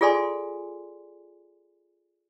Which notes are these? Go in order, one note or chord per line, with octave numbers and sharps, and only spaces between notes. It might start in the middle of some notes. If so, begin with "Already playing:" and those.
F4 G#4 A4 D5 G#5 C6